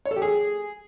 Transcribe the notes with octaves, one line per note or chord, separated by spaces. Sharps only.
C#5
A4
G4
G#4